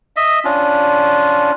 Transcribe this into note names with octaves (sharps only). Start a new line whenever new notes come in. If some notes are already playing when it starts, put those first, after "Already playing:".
D#5 E5
C#4 D4 F4